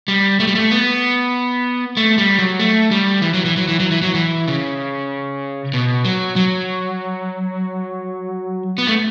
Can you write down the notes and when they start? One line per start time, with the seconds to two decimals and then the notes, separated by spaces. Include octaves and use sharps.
0.08 G3
0.40 A3
0.47 G3
0.55 A3
0.71 B3
1.97 A3
2.18 G3
2.39 F#3
2.59 A3
2.91 G3
3.22 E3
3.34 F#3
3.45 E3
3.57 F#3
3.68 E3
3.80 F#3
3.91 E3
4.02 F#3
4.14 E3
4.48 C#3
5.74 B2
6.05 F#3
6.36 F#3
8.78 B3
8.87 A3